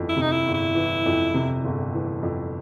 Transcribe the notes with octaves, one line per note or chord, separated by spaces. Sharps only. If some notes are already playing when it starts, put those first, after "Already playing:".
Already playing: G1 F2 E3
E4
C3
D#4
E4
G1
E4
E3
F2
C3
G1
E3
F2